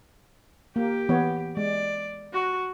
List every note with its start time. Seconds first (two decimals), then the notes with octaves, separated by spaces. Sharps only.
0.76 A#3 G4
1.09 E3 B3 C#5
1.57 G#3 D5
2.33 F#4